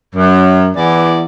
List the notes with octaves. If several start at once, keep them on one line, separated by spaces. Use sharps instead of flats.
F#2
E2 E3 D5